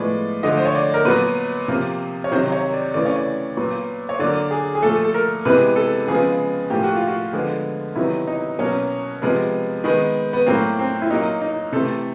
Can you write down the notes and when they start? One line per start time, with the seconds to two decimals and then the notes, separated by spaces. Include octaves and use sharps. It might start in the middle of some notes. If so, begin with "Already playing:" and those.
Already playing: A2 F3 G#3 B3 D5
0.43 D3 F3 A3 D#5
0.57 C5
0.65 C#5
0.75 D5
0.94 A#4
1.05 A#2 F#3 B3 B4
1.68 C3 F3 A#3
2.24 C#5
2.32 C3 D#3 F#3 C5
2.52 C#5
2.74 D5
2.94 C#3 E3 A3 D5
3.06 C#5
3.16 D5
3.57 A#2 F#3 B3
4.09 C#5
4.19 D3 F#3 A#3 D5
4.51 G#4
4.75 G#4
4.82 A#2 F3 A3 A4
5.04 A4
5.14 A#4
5.45 C3 E3 G#3 B3 B4
5.76 A4
6.07 C#3 F3 G#3 B3 G#4
6.70 A2 F3 A#3 G4
6.84 F#4
6.96 F4
7.08 F#4
7.33 D3 F3 G#3 B3
7.96 C3 D#3 F#3 B3 E4
8.27 D#4
8.59 B2 F#3 A#3 C#4
9.22 C3 F3 G#3 B3
9.84 D#3 G#3 B3
10.33 B3
10.47 A2 F#3 A#3 C4
10.79 C4
11.02 E4
11.10 A#2 F#3 A#3 D#4
11.42 D#4
11.72 C3 E3 A3 A4